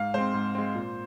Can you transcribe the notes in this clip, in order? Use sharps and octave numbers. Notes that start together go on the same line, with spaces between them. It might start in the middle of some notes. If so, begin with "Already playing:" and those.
Already playing: G#2 F5
G#3 C4 C5
G#2
G#3 C4
A#2